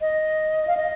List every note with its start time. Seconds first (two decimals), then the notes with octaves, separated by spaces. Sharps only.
0.01 D#5
0.67 F5
0.77 D#5